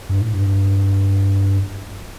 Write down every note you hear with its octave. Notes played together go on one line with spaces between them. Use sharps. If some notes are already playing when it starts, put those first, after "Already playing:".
G2
A2
G2